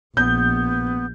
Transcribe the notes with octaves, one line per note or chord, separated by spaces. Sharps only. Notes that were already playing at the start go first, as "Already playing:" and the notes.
A#1 B3 G6